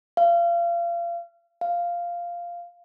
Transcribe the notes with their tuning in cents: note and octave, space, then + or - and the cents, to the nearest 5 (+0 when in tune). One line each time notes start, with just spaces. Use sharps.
F5 -30
F5 -5